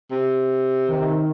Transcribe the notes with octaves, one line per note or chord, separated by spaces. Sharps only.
C3
D#3